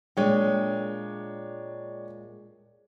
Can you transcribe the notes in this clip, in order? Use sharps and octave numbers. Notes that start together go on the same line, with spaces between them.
A#2 G#3 D4 C#5 G5